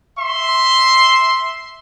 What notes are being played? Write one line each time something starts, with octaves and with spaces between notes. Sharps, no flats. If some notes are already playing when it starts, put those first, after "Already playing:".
E5 C6